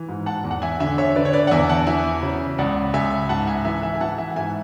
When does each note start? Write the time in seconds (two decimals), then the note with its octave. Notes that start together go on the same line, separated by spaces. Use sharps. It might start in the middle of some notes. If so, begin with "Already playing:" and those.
Already playing: E3
0.09 G#2
0.26 F#5 A5
0.44 E2
0.51 F#5
0.62 E5 G#5
0.80 D3 E5 G#5
0.98 C#5 E5
1.16 D3 B4 D5
1.25 C#5
1.33 B4 D5
1.47 F#5
1.51 E2 E5 G#5
1.69 F#5 A5
1.87 E3 E5 G#5
2.23 C#3
2.58 C#2 D5 F#5
2.94 C#2 E5 G#5
3.29 G#2 F#5 A5
3.47 E5 G#5
3.65 E3 E5 G#5
3.82 E5 G#5
3.95 G#5
4.01 E3 F#5 A5
4.18 E5 G#5
4.30 F#5
4.36 G#2 E5 G#5